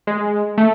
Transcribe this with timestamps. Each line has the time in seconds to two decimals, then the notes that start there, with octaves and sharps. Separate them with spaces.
0.07 G#3
0.58 A3